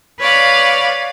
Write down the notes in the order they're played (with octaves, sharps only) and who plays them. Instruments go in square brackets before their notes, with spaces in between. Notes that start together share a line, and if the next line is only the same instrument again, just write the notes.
[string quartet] B4 C#5 D5 F5